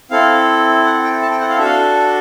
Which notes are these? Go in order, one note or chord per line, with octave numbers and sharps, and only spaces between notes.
C4 E4 A4 F5
F#5
G5
A5
G5
F#5
F5
D4 F#4 A4 E5
F5